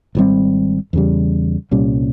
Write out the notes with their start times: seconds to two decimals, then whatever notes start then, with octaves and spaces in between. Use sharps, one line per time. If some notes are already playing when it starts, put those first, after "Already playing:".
0.15 G#1 G#2 G3 C4
0.93 E2 C#3 G3
1.71 C2 A#2 G3 C#4